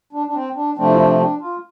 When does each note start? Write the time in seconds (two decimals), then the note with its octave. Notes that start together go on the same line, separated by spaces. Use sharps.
0.13 D4
0.27 D4
0.34 C4
0.56 D4
0.77 C3 F3 A3 C4 D4
0.90 E4
0.98 D4
1.20 D4
1.41 F4